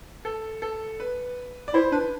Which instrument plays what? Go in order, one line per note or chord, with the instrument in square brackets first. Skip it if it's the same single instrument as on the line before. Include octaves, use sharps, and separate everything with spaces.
[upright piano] A4
A4
B4
D5
[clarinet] E4 [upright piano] C5
[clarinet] D4 [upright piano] B4